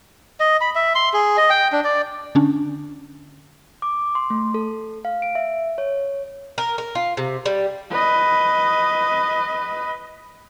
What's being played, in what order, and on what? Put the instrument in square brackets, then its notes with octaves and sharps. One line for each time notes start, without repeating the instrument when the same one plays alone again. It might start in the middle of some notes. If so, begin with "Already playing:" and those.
[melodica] D#5
B5
E5
C6
G#4
D#5
G5
D4
D5
[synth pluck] D3 C#4 D4
[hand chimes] D6
C6
A3
A4
F5
D7
E5
C#5
[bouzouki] A#4
A#4
F4
C3
G3
[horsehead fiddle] B4 D#5